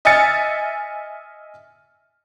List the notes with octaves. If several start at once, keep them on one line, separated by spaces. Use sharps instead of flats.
D#5 E5 G#5 F6 A6 C#7